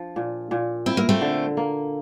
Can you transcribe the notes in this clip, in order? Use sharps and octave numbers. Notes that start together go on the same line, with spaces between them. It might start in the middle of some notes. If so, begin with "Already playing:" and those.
Already playing: F3 D4 F4
A#2
A#2
C4 E4
A#3
A3 C4
D3
A#3